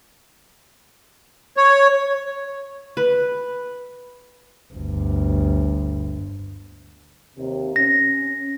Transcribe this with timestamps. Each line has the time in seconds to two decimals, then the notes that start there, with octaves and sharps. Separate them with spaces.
1.57 C#5
2.97 B4
4.74 G1 D2
7.37 D#2 C3
7.76 C#4 A#6